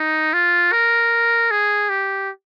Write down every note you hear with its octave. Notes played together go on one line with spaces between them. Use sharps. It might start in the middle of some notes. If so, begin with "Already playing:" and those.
Already playing: D#4
F4
A#4
G#4
G4